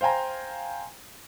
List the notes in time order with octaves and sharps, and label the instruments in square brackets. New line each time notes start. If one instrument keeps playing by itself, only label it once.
[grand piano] C5 F5 G5 G#5 A#5